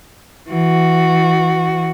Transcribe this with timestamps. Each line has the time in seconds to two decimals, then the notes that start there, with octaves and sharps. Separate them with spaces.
0.48 E3 F#4